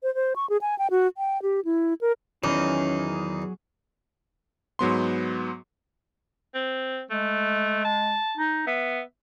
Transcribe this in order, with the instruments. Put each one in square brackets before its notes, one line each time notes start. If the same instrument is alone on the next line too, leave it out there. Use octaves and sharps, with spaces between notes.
[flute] C5
C5
C#6
G#4
G#5
G5
F#4
G5
G4
E4
A#4
[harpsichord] E2 [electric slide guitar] D#3 D#4 [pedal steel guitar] F#3 G#4 [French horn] C#4
[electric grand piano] G#2 F#3 B3 C6
[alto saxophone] C4
[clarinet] G#3 [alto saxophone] A3
[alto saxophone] A5
[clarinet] D#4
[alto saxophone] B3 [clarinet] E5